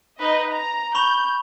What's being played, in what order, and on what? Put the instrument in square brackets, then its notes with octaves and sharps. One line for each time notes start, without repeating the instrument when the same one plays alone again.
[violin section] D#4 B4 D#5
A#5
[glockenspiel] B5 C#6 F7 [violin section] G6